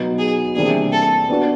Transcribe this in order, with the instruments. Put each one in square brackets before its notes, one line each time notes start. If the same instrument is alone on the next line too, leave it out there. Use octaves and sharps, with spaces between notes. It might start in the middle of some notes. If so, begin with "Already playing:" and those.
Already playing: [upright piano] B2 F#3 B3 D#4
[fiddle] G#4
[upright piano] C3 E3 G3 A#3 D4 [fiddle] G#4
[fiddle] A4
[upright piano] B3 D4 F#4 B4